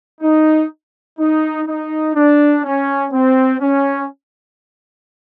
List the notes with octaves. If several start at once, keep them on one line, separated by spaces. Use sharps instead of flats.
D#4
D#4
D#4
D4
C#4
C4
C#4